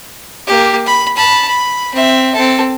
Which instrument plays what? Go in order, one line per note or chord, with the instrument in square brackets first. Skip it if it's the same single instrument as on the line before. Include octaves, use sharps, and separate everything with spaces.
[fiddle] A#3 G4
B5
A5 B5
B5
C4 E5
C4 A4